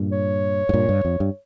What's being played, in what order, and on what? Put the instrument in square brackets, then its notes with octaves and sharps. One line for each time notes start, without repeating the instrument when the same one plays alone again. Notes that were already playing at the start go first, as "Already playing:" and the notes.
Already playing: [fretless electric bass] G2 A#2
[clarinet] C#5
[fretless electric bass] G#2
G2 A#2
G2
F2
G2